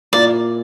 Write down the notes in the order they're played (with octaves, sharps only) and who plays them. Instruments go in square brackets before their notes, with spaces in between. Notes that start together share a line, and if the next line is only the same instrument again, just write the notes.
[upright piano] A#2 A#3 E4 A#4 [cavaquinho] D5